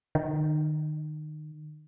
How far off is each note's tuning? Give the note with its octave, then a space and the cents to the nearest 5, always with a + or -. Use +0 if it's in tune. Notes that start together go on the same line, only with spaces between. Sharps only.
D#3 -30